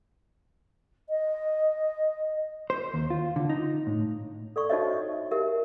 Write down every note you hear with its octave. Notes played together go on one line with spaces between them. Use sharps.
D#5
C5
D#2
F4
D3
D#4
A2
A4 D5 C#6
D#4 F#4 C5 C#5 D#5 E5
G4 A#4 E5